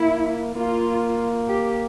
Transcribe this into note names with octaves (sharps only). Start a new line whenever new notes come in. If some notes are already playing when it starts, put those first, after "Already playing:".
Already playing: A#3 E4
A#3 F4
G4